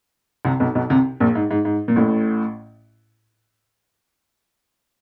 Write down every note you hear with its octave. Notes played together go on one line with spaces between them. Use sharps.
C2 C3
B1 B2
B1 B2
C2 C3
A#1 A#2
G#2
G#2
G#2
A#2
A1 A2